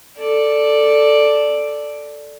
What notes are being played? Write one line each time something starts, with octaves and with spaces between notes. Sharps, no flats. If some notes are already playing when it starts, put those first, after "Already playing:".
A4 D5